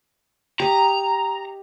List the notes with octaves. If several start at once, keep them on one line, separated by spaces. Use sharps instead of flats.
G4 D#5 A#5